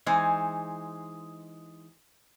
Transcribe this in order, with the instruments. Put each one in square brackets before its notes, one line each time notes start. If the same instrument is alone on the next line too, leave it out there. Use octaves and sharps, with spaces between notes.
[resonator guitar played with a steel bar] E3 G#3 D#4 C5